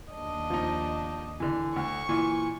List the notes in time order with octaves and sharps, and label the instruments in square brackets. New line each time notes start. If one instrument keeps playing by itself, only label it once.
[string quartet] D#2 D4 D#5
[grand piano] F3 D#4
D3 E3
[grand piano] D2 [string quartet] C#6
[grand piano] A#2 E3